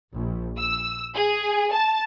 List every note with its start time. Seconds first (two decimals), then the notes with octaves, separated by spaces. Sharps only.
0.15 A#1
0.57 E6
1.15 G#4
1.73 A5